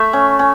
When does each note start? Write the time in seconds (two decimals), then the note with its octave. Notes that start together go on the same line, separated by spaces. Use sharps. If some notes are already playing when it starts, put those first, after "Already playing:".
Already playing: A3 E5
0.13 C#4
0.39 C#4